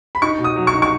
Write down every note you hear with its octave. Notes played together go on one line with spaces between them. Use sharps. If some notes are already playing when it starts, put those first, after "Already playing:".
B5
D#4 C#6
B2
D#6
F#3
C#6
D#4
C#6